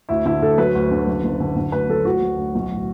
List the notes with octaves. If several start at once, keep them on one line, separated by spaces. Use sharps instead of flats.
D2 E4
D3 E4
D2 A4
F#3 B4
D2
D3
F#1
F#1
D3
D3
D2 B4
F#3 A4
D2 F#4
F#3
D2
B1
A2